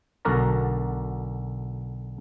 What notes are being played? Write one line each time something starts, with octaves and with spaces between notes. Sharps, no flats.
B1 D3 F#4 A#4 D5 A#5